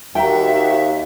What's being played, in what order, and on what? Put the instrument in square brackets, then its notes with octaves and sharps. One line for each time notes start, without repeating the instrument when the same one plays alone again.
[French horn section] D#2 [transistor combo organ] F#4 [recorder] E5 [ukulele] G5 A#5